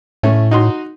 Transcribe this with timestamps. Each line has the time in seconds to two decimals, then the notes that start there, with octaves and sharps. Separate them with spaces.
0.23 A2 A3 C#4 A4
0.51 D#4 F#4 C6